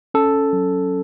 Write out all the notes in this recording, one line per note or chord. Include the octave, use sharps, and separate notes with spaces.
C#4 A4
F#3